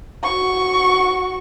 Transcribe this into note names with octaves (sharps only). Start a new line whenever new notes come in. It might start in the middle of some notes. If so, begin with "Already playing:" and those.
F#4 C#6